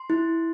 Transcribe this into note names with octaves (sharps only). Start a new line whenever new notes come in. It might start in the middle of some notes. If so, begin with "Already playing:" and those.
Already playing: C6
E4